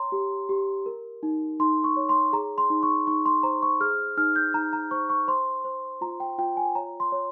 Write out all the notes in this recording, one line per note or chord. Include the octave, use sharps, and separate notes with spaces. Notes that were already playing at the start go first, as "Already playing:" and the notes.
Already playing: C#5 A#5 C6
G4
G4
A#4
D#4
D#4 C6
C#6
C#5
C6
G#4 A#5
C6
D#4
C#6
D#4 C#6
C6
C5 A#5
C#6
G#4 F6
D#4 F6
G6
D#4 A#5
A#5
C5 C#6
C#6
C5 C6
C5
F4 A#5
G5
F4 G5
G#5
C#5 A#5
C6
C#5